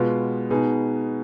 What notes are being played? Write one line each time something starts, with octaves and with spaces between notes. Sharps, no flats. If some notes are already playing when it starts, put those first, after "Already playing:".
Already playing: B2 G#3 B3 F4
B2 B3 D#4 G#4